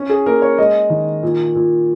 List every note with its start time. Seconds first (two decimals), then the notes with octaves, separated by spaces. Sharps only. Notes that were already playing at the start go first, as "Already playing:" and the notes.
Already playing: C#4
0.09 G#4
0.26 A#3 A#4
0.42 C#5
0.58 G#3 D#5
0.90 D#3
1.23 A#2
1.55 A#2